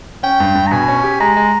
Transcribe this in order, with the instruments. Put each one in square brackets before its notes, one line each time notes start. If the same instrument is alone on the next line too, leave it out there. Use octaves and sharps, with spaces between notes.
[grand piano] C#4 [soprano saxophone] G5
[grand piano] G2
G2
[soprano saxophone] A#5
[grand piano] B2 [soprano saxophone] G#5
[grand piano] C#4
G4
[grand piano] G#3 [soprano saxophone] A#5
[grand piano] G#3